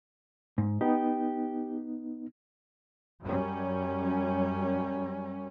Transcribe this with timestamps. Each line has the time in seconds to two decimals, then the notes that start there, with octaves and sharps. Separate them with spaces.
0.58 G#2
0.81 B3 D#4 G4
3.23 F#2 G3 C#4